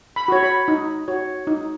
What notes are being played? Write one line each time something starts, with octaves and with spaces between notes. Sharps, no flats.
B5
F#4 C#5
B5
D#4
F#4 C#5
D#4